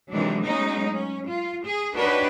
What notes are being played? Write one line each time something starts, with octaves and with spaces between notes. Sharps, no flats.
C3 D#3 E3 F#3 G#3 D4
F#3 G#3 A3 B3 C#4 D#4
C#4
F4
G#4
D4 D#4 F#4 G4 B4 C#5